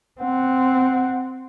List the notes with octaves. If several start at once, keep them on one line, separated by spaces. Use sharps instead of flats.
C4 F#5